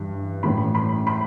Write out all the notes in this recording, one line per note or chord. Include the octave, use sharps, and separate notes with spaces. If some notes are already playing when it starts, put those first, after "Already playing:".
Already playing: G2 E3
A2 E3 B5
B5
B5